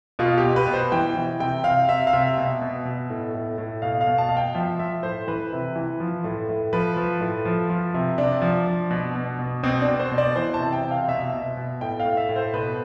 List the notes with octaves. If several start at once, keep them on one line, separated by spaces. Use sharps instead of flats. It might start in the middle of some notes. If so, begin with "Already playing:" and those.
B2 F4
G4
B2
B4
B2
C5
E3 G5
E3
C3 G5
C3 F5
C3 E5
F5
C3 E5
B2
B2
B2
A2
A2
A2
B2 F5
F5
B2
A5
B2 F5
G5
F3 E5
F3 E5
A2 C5
E3 B4
C3
E3
F3
A2
A2
F3 B4
F3
A2
F3
F3
C3
C3 D4
F3
F3
B2
B2
B2
B2 C4
D4
B2
C5
B2
D5
E3 C5
A5
C3
G5
C3
F5
B2 E5
B2
B2
A2 G5
F5
A2
E5
A2
C5
B2 B4